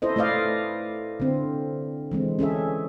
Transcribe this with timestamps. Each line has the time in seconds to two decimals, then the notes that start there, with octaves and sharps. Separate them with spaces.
0.02 E4 A4 C5 D#5
0.16 A3 E4 B4 D5 D#5 F5
1.20 D3 C4
2.12 E3 G#3 C4
2.39 C#4 G#4 A4 E5